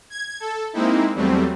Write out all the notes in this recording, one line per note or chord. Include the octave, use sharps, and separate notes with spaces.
G#6
A4
G#3 A#3 C4 D#4 E4
E2 F#3 G3 A3 C4